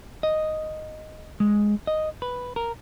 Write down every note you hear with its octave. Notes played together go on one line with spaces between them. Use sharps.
D#5
G#3
D#5
B4
A#4